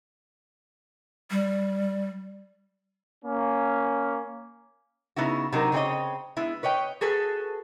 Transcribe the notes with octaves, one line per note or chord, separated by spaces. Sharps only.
G3
A#3 C#4
C#3 B3 D#4 E4 F#4
C3 F#3 D#4 A#4
C#3 C4 G#4 C#5 D#5
G#3 B3 E4
B4 C#5 D#5 G5
F#4 G#4 A4 B4